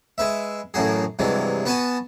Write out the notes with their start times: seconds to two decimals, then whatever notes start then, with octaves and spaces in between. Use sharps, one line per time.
0.18 G#3 B4 E5
0.74 A1 F#2 A2 F#4 G#4
1.19 G2 C3 E3 F#3 G#3
1.65 B3 F#4 B4 F#5 G#5 A5